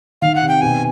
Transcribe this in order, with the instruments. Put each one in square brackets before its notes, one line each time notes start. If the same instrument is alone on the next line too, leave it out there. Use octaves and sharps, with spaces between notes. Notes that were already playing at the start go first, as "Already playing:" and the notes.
[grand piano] D#3 [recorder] F5
[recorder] F#5
[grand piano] C3
[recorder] G5
[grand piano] B2 [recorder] G#5